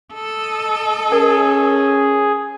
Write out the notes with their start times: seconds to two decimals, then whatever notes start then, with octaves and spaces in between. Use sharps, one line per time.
0.14 A4 D#5
1.12 C#4 G#4 A#4 G#5